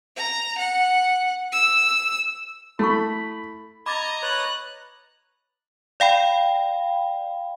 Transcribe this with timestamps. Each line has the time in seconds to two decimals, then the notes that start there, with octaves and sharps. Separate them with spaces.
0.17 A#5
0.59 F#5
1.52 E6
2.79 A3 E4 A4 B5 C#6
3.86 D#5 A#5 B5 D6 G#6 A6
4.22 B4 C#5 F#6
6.00 D5 F5 G5 B5